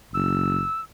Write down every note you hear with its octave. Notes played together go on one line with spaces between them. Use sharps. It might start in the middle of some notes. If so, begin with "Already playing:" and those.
F#1 E6